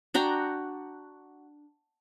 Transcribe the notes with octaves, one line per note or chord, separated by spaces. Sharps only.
D4 F#4 G5 A#5